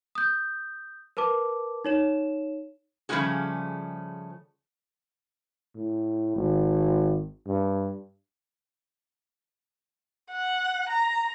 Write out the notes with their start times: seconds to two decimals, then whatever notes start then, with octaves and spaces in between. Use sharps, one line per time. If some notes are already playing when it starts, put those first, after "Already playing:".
0.15 D#6 G6
1.17 A#4 B4 A5 D6
1.85 D#4 C#5 E7
3.09 C#3 F3 G3 A3 F#4 G#4
5.75 A2
6.36 G#1
7.47 G2
10.32 F#5
10.90 A#5